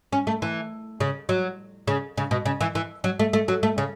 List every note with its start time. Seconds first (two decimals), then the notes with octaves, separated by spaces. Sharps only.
0.13 C#4
0.27 A3
0.42 E3
1.00 C#3
1.29 F#3
1.88 C#3
2.18 C#3
2.31 B2
2.45 C#3
2.61 E3
2.75 E3
3.04 F#3
3.19 A3
3.33 A3
3.48 F#3
3.63 A3
3.78 C#3